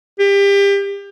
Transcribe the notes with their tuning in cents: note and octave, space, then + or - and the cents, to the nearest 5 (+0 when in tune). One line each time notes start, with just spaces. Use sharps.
G4 +30